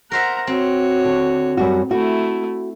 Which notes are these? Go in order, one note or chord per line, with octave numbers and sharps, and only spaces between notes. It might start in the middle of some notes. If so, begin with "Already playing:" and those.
A#4 C5 E5 F#5 A#5
C4 F#4 C#5
D3
F#2 G3 F#4
A3 E4 F#4